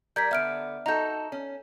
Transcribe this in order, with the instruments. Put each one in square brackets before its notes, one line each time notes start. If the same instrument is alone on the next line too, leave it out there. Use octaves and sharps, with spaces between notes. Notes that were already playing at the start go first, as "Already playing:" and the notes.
[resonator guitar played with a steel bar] G3 A#4 D5 [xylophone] G6 G#6 B6
[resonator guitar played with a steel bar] D3 B3 [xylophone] E5 F6 D7
[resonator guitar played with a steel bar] D#4 F#4 A4 [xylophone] A#5 G6
[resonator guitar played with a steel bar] C#4